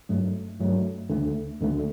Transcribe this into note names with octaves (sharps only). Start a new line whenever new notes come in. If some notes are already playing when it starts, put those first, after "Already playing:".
G2 F#3 A3
G2 F#3 A3
D2 D3 A3
D2 D3 A3